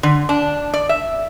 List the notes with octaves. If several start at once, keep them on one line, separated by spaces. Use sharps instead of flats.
D3
D4
D5
E5